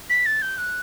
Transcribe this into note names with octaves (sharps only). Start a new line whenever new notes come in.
B6
A6
G6
F#6